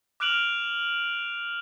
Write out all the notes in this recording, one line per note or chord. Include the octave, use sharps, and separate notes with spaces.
D6 F6 F#6 D7 F7 F#7